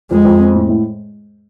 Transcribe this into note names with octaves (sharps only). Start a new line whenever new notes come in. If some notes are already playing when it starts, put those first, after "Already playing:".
F2 G#3
F2
C4
A2
A2